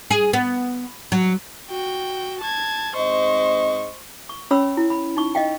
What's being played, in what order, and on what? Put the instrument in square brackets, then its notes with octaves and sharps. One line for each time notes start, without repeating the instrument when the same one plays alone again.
[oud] G#4
B3
F#3
[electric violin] F#4 G5
A5 G#6
[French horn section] G#2 C4 D#5 [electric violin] C5 C#6
[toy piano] C#6
C#4 C#5 B5 E6
E4
B5
D#4 C#6
D#5 F5 G5